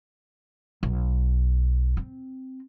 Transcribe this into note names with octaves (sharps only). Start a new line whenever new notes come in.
B1
C4